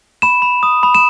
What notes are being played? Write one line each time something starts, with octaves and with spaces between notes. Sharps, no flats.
B5 E7
B5
D#6
B5
E7